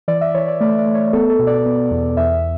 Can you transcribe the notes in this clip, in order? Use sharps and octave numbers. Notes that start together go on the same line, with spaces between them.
E3 D5
E5
E3 C#5
D5
A3 D5
D5
A3
C#5
B3 A4
A4
B2
D5
B3
E2
E2 E5